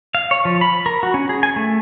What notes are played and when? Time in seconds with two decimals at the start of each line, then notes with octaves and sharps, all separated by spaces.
0.15 F5
0.31 C#5
0.45 F3
0.61 B5
0.86 A#4
1.03 F#4
1.14 C#4
1.29 G#4
1.43 G#5
1.56 A3